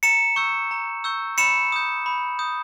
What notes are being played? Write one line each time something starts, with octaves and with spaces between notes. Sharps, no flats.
A#5 C#7 E7
C#6 E6 G6
A#5
C#6 E6 G6
B5 C#7 E7
D#6 G6
B5
D#6 G6